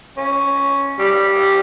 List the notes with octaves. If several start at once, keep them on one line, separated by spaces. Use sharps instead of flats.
C#4
G3